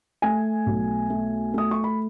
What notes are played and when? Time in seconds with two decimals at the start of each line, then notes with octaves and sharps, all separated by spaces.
0.22 A3 G#5
0.66 B1
1.10 A3
1.54 A3 D#6
1.71 C#6
1.84 B5